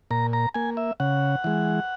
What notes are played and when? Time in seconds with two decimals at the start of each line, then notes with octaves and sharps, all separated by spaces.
0.11 A#2 A#5
0.33 A#5
0.54 A#3 G#5
0.77 E5
1.00 C#3 F#5
1.44 E3 G#3